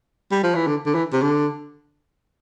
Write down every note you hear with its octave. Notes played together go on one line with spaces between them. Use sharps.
G3
F3
E3
D3
D3
E3
C3
D3